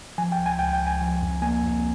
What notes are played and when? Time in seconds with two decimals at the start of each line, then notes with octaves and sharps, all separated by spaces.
0.18 F3 G#5
0.32 G5
0.38 C#2
0.46 G#5
0.59 C#2 G5
0.73 G5
0.80 C#2
0.87 G#5
1.01 F3
1.22 F2
1.42 A#3 G#5
1.63 F2